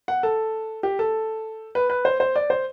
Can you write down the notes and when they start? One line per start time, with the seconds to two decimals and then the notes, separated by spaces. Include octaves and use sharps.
0.08 F#5
0.23 A4
0.83 G4
0.99 A4
1.75 B4
1.90 B4
2.05 C5
2.20 C5
2.36 D5
2.50 C5